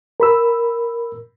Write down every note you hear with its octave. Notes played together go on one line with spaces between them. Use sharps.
A#4 B5 E6